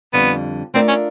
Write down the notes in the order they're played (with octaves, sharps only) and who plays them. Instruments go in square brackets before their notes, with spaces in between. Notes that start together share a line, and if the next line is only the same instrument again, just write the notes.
[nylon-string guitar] F2 D3 G3 [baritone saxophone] B3
[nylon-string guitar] A3 D4 F4 A#4 D5 [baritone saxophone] C4
[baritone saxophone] C#4